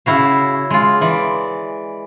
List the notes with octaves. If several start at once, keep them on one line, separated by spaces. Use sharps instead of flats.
C#3 E4 F#4 F5
G#3 F4
E3 D5